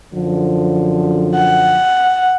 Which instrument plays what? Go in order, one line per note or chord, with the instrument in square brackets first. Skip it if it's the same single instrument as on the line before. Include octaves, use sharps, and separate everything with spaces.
[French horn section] F#2 D3 F3
[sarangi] F#5